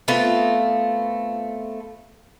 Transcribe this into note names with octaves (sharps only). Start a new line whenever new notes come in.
A3 B3 C4 F4